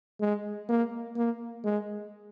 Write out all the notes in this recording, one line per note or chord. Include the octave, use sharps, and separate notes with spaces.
G#3
A#3
A#3
G#3